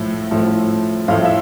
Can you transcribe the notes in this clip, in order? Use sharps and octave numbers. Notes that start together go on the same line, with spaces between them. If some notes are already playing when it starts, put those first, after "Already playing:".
Already playing: A2 F3 A3
A2 F3 A3
A2 F3 A3 F5
E5